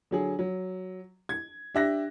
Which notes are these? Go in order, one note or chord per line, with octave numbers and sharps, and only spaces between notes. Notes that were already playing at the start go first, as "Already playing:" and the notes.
D3 F#3 G#4
F#3
G#6
D4 G4 E5 F#6 A#6